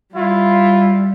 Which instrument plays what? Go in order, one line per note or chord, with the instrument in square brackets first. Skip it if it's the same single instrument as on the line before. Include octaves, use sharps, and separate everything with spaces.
[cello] G3 [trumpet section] E4 F4